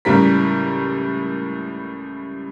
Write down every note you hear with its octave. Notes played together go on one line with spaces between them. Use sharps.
C#2 A2 G3 A#4 B6